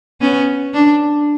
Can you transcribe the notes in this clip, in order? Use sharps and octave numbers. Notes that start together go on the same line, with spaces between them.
B3 C#4
D4